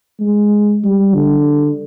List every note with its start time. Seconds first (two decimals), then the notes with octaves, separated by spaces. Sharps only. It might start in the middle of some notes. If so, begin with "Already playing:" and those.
0.20 G#3
0.84 G3
1.14 D3